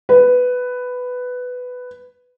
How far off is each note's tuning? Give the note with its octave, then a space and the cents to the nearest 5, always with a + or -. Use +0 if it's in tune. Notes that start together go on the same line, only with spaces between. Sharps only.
B4 +10